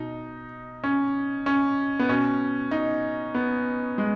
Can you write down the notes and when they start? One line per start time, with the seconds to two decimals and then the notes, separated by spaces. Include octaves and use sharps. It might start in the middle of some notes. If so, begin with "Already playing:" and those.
Already playing: B2 D#4
0.84 C#4
1.46 C#4
1.99 B3
2.09 B2 C#4
2.71 D#4
3.35 B3
3.98 G#3